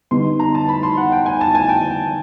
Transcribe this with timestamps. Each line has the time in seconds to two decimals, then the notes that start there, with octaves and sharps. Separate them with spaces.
0.11 D3 G3 B3 D#4 C6
0.40 A#5
0.55 A5
0.69 B5
0.83 C6
0.97 F#5
1.12 G5
1.26 G#5
1.41 A5
1.55 G#5
1.69 G5